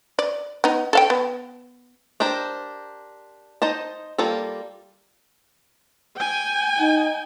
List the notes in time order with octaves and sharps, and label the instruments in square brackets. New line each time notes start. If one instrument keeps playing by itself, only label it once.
[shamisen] D5
B3 D#4
A4 F5 G5
B3
[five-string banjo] D4 G4 A#4 C5
D#4 C5 D#5 A5
G3 A#3 F4 A4
[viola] G5 G#5
[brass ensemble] D#4